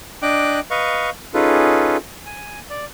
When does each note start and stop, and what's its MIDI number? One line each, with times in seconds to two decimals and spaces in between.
0.22 0.60 62
0.22 0.60 75
0.22 0.60 79
0.22 0.60 86
0.22 0.60 90
0.71 1.10 71
0.71 1.10 75
0.71 1.10 77
0.71 1.10 85
1.34 1.97 61
1.34 1.97 63
1.34 1.97 65
1.34 1.97 68
1.34 1.97 69
1.34 1.97 71
2.26 2.59 80
2.70 2.85 74